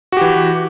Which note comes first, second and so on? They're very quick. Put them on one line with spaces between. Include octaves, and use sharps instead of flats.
F#4 G4 E3